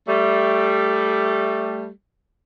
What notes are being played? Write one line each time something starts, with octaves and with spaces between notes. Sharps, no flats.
G3 A3